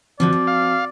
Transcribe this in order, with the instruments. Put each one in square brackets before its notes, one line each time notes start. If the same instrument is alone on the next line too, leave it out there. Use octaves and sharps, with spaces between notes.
[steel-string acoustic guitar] G2 D3 F3 [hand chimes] C4 F#4 [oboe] D5
[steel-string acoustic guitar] F3
[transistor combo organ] F5